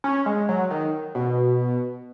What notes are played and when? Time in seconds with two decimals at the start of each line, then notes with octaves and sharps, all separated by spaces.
0.04 C#4
0.26 G#3
0.49 F#3
0.71 D#3
1.15 B2